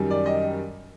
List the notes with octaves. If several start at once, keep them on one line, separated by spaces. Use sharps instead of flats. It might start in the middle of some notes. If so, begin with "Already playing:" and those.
Already playing: F#2 D#3 G3
D5
D#5